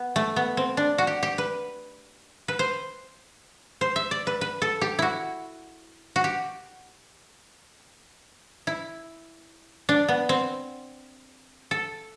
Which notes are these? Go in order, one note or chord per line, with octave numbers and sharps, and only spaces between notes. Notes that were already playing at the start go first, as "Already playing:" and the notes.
Already playing: B3
A3
B3
C4
D4
F#4
G4
G4
B4
B4
C5
C5
E5
D5
B4
B4
A4
G4
E4 F#4
F#4
G4
E4
D4
B3
C4
A4